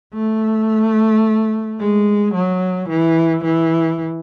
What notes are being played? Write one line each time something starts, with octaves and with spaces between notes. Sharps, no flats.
A3
G#3
F#3
E3
E3